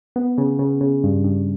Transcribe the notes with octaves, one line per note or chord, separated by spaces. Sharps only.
B3
C#3
C#3
C#3
G2
G2